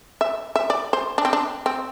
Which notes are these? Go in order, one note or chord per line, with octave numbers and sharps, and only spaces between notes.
E5
E5
D5
C5
D4
C4
D4
C4